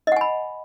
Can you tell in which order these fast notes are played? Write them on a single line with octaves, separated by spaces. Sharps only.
D#5 F#5 G#5 B5